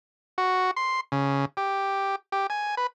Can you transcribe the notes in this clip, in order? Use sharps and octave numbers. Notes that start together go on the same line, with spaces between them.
F#4
C6
C#3
G4
G4
G#5
B4